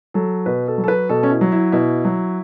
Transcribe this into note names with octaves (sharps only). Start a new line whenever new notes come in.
F#3 A4
B2 B4
A4
F#3
A4
B4
B2 A4
C#4
E4
F#3
E4
B2 E4
F#3